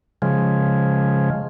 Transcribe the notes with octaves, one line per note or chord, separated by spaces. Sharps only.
C#3 F3 G#3